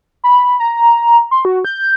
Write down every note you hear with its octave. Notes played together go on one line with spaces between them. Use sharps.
B5
A#5
C6
F#4
G6